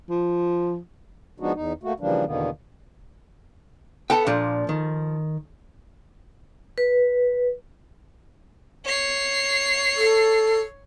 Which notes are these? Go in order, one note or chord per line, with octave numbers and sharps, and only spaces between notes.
F3
F3 G#3 B3 D4 D#4 F#4
E2 D#4
A3 A#3 F#4
C#3 E3 F3 G3 A#3 D4
E2 B2 D3 D#3 A#3 B3
B3 A4 G5 A5
A#2 F3 D4
D#3
B4
C#5 C7
A4